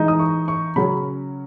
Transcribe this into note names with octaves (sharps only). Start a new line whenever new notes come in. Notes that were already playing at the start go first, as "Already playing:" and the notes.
Already playing: E3 G#3 D#4
D#6
C#6
C#6
C#3 F#3 C#4 B5